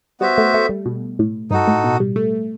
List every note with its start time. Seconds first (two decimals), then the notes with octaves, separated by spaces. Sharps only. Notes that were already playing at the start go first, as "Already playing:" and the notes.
0.20 G3 B3 F#4 C5 E5
0.38 A3
0.54 A3
0.69 G3
0.86 B2
1.19 A2
1.51 G2 D#4 F#4 A4
1.67 A2
1.84 B2
2.00 G3
2.16 A3